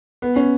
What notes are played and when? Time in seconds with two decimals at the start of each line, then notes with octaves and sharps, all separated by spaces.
0.22 B3
0.36 C#4